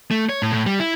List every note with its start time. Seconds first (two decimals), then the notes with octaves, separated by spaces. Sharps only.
0.11 A3
0.29 C#5
0.42 A2
0.53 A2
0.66 G3
0.80 E4